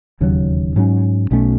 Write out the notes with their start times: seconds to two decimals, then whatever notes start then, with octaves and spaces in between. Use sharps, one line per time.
0.20 E1 D#2 C#3 F#3
0.76 G#2 F#3 C#4
1.31 B1 B2 A3 C#4